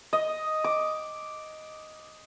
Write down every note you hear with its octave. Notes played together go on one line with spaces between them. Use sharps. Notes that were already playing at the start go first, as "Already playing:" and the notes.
D#5
D6